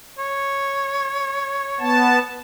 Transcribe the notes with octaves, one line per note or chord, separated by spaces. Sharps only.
C#5
B3 A5